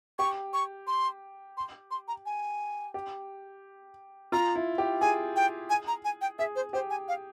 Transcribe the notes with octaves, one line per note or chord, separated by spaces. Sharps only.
G4 C#6
C#6
C6
C6
C6
A#5
G#5
G4
F4 A#5
E4
G4
G#4 G#5
G5
G#5
A#5
G#5
G5
G#4 E5
C5
G4 C5
G#5
F5